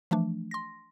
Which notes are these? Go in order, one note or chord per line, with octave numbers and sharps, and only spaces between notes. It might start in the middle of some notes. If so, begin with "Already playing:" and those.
E3 F3 A3 D4
C6 A#6